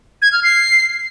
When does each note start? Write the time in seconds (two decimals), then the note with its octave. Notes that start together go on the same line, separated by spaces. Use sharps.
0.22 G#6
0.33 F6
0.43 C7